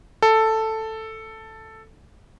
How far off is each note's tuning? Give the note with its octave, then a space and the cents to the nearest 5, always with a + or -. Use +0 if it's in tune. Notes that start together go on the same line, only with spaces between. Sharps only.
A4 +5